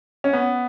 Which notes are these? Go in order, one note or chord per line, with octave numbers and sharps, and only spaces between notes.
C#4
B3